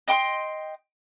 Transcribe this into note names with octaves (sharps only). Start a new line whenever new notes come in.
D#5 G5 B5 C6